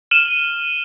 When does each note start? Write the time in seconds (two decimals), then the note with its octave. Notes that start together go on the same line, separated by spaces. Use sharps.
0.11 F6 D#7 E7 F#7 G7